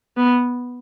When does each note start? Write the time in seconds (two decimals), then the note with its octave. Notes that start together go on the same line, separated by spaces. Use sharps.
0.17 B3